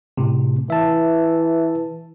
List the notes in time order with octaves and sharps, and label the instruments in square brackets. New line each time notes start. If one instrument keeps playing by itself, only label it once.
[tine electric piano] A2 C3
[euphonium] E3 [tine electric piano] E5 A5